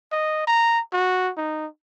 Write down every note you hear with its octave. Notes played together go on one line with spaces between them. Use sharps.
D#5
A#5
F#4
D#4